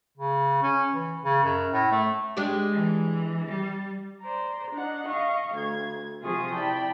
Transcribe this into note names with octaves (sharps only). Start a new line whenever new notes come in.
C#3
C#4
E3
C#3
F#2
A2
A3
G#3 D4 G4
E3
G3
C5 D5 A#5
D4 D#4 F#5
D#5 F5 C#6
D2 G#6
C3 F3 F4 G#4 C#6 D#6
E4 D5 G5 A5 B5